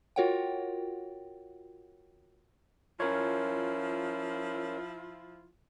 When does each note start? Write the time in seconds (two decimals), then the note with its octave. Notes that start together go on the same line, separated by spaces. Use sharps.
0.16 F4 F#4 A#4 C#5 F#5 G5
3.00 F3 C#4 E4 F4 A#4 C#5